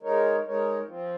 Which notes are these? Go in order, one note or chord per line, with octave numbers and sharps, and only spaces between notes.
G#3 D#4 A#4 C#5
G#3 D#4 A#4 C#5
F3 C4 F4